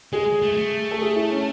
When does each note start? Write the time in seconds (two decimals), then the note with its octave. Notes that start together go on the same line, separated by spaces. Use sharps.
0.13 G#3 G#4
0.42 A3
0.52 G#3
0.57 A3
0.91 A4
1.02 G#4
1.16 E4
1.30 C#4